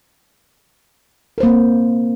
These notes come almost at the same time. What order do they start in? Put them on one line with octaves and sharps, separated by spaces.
A#4 C5 A#3 C4